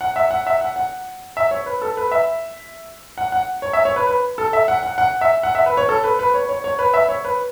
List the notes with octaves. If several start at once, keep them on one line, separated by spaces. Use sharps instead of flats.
F#5
E5
F#5
E5
F#5
F#5
E5
C#5
B4
A4
B4
E5
F#5
F#5
C#5
E5
C#5
B4
B4
A4
E5
F#5
F#5
F#5
E5
F#5
E5
B4
C#5
A4
B4
B4
C#5
C#5
C#5
B4
E5
C#5
B4